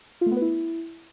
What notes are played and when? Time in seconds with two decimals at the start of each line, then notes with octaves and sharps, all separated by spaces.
0.21 F4
0.26 A3
0.32 B3
0.37 B4
0.42 E4